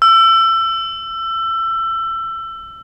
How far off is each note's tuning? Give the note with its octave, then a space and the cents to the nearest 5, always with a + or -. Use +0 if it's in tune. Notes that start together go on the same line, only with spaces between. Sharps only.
E6 +25